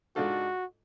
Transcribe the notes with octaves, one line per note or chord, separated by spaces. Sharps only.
G#2 G#3 D4 F4 F#4 A4